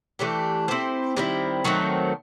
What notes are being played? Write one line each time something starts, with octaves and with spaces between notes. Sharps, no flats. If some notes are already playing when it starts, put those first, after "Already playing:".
E3 A3 D4 G4
C4 E4 G4 C5
D#3 G3 C4 E4
D#3 F#3 A3 C4